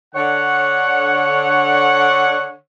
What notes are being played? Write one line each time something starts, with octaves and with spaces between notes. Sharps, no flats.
D3 C#5 F#5